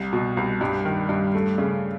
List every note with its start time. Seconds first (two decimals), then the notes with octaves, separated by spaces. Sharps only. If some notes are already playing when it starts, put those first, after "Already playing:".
Already playing: C2
0.13 B2
0.37 C2
0.61 G2
0.85 D#3
1.09 G2
1.35 A3
1.58 C#3